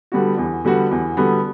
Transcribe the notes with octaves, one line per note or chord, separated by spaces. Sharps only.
D3 G3 B3 F#4
E2
D3 G3 B3 F#4
E2
D3 G3 B3 F#4